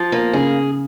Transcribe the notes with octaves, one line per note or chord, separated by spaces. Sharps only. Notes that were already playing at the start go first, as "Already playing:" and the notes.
Already playing: F3
A#3
C#3 G#4